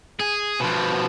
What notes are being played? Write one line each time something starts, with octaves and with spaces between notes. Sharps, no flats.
G#4
B2 F3